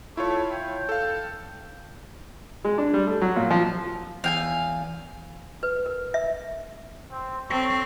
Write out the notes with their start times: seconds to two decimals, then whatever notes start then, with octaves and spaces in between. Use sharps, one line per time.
0.17 A3 E4 F4 C#5
0.51 G5
0.89 A4 F5
2.64 G#3
2.78 D4
2.93 G3
3.07 A3
3.21 F#3
3.36 A#2
3.51 F3
4.24 E2 F5 G5 G#5
5.63 B4
5.86 A#4
6.14 E5
7.11 C4
7.50 C4 A4 C#5 C#6